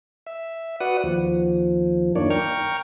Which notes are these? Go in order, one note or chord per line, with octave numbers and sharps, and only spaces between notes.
E5
F#4 B4 D5 F#5 D#6
D#2 F3
F#2 D#3 A#3 D4 C#5 D5
G5 A#5 C#6 F6